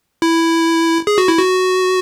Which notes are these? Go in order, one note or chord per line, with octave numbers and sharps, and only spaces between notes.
E4
G#4
F#4
E4
F#4